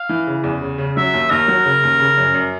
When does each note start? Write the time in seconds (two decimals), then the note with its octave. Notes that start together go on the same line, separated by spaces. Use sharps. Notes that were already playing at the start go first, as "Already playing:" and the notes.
Already playing: F5
0.09 E3
0.27 C#3
0.44 E2
0.62 C#3
0.78 C#3
0.97 F#3 E5
1.13 D#2
1.30 D#2 A#4
1.48 F#3
1.65 C#3
1.83 D#2
1.99 C#3
2.18 F#2
2.34 F#2